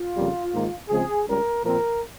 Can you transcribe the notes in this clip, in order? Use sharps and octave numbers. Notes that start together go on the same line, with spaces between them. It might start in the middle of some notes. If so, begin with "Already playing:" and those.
Already playing: F4
F2 C#3 G3 A#3
G#2 D#3 A#3
C#2 C#3 F3 G#3 C4 G#4
C#2 C#3 G3 A#4
A#2 F3 C4 A#4